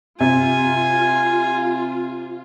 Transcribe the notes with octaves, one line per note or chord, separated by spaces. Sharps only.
C3 F4 G#5